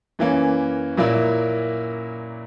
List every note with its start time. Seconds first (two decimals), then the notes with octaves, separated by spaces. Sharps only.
0.19 F#2 E3 A#3 C#4
0.97 A#2 F#3 A#3 E4